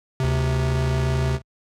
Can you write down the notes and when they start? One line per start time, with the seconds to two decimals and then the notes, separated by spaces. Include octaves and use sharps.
0.20 D2 C3